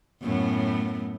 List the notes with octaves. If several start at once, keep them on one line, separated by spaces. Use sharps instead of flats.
F#2 A2 B3